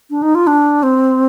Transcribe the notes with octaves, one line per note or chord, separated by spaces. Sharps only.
D4
D#4
F4
D4
C4